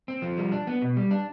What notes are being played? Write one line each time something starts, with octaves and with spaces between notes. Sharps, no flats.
C4
F3
G3
D4
B3
B2
G3
D4